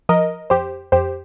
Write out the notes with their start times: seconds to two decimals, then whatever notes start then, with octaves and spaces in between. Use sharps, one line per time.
0.09 F3 A#4 D#5
0.50 F2 G4 C5
0.92 F2 G4 C5